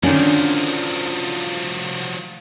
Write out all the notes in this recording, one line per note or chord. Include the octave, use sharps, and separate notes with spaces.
D3 D#3 F3 F#3 C#4 D4